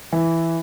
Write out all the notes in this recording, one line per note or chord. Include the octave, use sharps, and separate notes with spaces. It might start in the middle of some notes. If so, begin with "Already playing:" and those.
E3